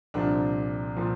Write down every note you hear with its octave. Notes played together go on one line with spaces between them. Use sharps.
C2 A#2 F3 D4
A#2 F3